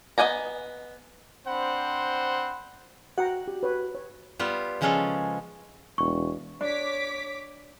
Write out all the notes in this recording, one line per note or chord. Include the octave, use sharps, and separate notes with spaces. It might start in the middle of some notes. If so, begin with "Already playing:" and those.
B3 D#5 F#5 G#5 A#5
C4 D4 C5 F#5 B5
F#4 F#5 G5 A#5
G4
B4 C#5
C#5
G3 B3 F4
C#3 F3 G#3 C#4 F4 A4
E1 C#6
D4 C#5 D6 B6